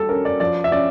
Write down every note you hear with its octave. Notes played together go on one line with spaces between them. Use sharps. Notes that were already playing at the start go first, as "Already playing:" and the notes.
Already playing: G3 A4
C#4 A#4
D5
F3 D5
E5
C#4 D5